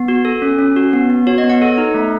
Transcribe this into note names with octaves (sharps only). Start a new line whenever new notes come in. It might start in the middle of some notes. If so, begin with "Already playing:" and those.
Already playing: B3
F#4
A4
C#4
C#4
F#4
B3
B3
F#4 C#5
D#5
B3
F#5
A4
D#4
A3